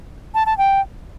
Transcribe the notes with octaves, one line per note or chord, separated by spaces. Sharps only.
A5
A5
G5